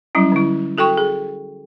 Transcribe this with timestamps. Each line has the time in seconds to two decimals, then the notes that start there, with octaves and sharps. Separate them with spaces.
0.15 F#3 G3 C#4 E4
0.32 D3 E4
0.78 F#4 A4 G5 C#6
0.97 G#4